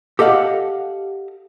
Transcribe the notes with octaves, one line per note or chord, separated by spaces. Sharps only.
G4 A4 D#5 F5 F#5